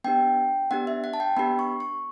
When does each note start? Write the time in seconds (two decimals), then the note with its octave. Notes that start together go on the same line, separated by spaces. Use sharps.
0.04 B3 D4 G4 G5
0.71 B3 D4 G4 F#5
0.87 E5
1.04 F#5
1.14 A5
1.20 G5
1.37 B3 D4 G4 B5
1.59 C#6
1.80 C#6